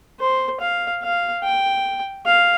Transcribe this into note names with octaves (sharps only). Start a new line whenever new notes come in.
C5
F5
F5
G5
F5